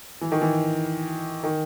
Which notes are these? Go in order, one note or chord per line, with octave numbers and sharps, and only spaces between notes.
E3
D#3
E3
D#3